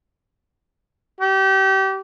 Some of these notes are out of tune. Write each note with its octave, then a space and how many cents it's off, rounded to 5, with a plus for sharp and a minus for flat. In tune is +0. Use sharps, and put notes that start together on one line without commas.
G4 -30